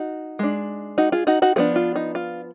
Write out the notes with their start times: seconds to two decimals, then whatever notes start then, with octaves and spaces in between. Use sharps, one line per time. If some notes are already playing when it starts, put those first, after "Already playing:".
Already playing: D#4 F#4
0.39 G#3 D4
0.98 D#4 F#4
1.12 F4 G#4
1.27 D#4 F#4
1.42 D#4 F#4
1.56 F3 B3 D4 F4 G#4
1.76 F4
1.96 D#4
2.15 F4